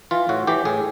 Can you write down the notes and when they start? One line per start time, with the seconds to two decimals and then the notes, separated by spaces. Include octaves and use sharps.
0.11 E3 F4
0.29 A2 F#4
0.47 E3 G4
0.65 A2 G#4